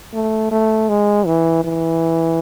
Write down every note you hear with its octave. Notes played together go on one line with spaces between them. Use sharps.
A3
A3
G#3
E3
E3